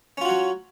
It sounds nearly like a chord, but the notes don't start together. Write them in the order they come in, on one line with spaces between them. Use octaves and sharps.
C#4 F4 F#4 F#3